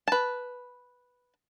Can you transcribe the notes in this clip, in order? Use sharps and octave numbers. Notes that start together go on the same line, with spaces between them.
B4 A5